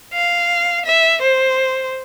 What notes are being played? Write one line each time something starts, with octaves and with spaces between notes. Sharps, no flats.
F5
E5
C5